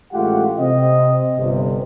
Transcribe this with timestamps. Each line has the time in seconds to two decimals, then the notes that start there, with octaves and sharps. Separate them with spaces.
0.12 A1 G#3 A3 F4 G4 F#5
0.59 C3 C4 D#5
1.36 G1 C3